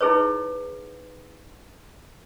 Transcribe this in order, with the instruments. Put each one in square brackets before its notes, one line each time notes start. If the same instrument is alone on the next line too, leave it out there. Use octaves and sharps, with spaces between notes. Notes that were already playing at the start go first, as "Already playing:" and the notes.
[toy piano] D#4 E4 G#4 B4 C#5